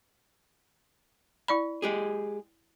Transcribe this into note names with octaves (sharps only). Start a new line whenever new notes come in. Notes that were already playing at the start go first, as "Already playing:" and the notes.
E4 D5 B5
G#3 G4 G#4